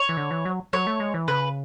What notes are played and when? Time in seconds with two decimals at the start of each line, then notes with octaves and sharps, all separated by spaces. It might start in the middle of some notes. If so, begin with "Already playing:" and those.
Already playing: C#5
0.09 E3
0.17 D3
0.31 E3
0.45 F#3
0.73 F#3 C#5
0.87 A3
1.00 G#3
1.14 E3
1.28 C#3 B4